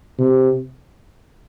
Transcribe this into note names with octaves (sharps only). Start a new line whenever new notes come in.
C3